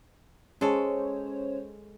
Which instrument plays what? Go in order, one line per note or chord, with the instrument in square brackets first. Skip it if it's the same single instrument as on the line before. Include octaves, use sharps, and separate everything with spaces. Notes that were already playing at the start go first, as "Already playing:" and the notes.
[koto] G#3 A4 [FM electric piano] C#4 C5 C#5